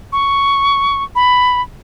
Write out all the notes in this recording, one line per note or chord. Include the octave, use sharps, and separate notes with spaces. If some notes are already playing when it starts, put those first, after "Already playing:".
C#6
B5